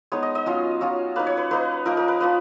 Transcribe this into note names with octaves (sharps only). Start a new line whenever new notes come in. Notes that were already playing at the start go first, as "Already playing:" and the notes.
G#3 B3 D#4 C#5
D#5
D#5
F#3 C#4 F4
F#3 C#4 F4
A#3 D#4 B4
C#5
B4
A#3 D#4 B4
F3 A#3 D#4 A#4
A#4
B4
F3 A#3 D#4 B4